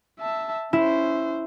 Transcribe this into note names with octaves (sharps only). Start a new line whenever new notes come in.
E5 A5
C#4 E4 C5